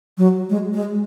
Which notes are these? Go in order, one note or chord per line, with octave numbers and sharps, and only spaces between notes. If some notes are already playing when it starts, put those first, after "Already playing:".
F#3
G#3
G#3